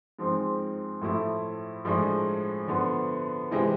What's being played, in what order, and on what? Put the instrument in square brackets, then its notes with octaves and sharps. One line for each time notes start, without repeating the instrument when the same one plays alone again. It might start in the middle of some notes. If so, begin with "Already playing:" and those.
[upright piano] G#2 F3 G#3 C4
A2 F3 A3 E4
A2 F3 G#3 D4
D3 F3 B3
C3 E3 G#3 C4